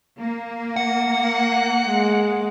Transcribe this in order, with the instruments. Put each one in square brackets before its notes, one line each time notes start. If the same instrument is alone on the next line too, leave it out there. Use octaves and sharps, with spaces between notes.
[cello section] A#3
[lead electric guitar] F#5
[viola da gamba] G#3